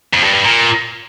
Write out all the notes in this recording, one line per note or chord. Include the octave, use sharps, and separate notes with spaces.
F2
G2
G2
A#2